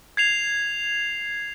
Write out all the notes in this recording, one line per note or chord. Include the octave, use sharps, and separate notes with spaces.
G#6 C7 F7